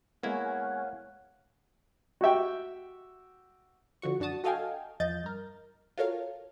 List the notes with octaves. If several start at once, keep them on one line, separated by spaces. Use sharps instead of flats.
G#3 A#3 B3 E4 C#5 F5 F#5 G#5
F#4 G4 E5 G5
D3 F3 F#4 C#6
F#2 D4 F#4 A5 D#6
F#4 A4 D#5 F5 G5 G#5
E2 F3 D#5 G6 A6
G2 A#4
F4 F#4 A4 A#4 C#5 F5